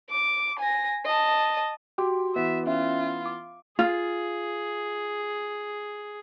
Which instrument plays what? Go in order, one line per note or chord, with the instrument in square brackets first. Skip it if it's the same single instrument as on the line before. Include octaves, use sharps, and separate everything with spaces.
[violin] D6
G#5 A#6
D#5 A5
[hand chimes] F#4 C6 D6 [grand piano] G4
[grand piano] E3 B3 [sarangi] E5
[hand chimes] C#4 E5 [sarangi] F4
[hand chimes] D6
[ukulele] F4 [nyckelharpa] G#4